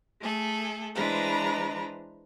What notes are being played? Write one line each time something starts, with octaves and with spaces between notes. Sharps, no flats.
A3 G#4 A4
E3 G#3 D4 B4 C5 A#5